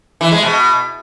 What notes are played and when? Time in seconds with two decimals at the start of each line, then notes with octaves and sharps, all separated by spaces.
0.21 E3
0.32 G#3
0.42 B2